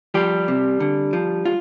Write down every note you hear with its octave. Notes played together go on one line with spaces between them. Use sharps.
F3 G3 G4
C3
D3
F3
F4